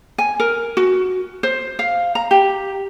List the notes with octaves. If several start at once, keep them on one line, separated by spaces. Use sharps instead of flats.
G#5
A#4
F#4
C5
F5
A#5
G4